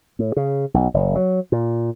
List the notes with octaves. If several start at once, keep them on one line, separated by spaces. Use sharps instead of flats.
A2
C#3
B1
F#1
F#3
A#2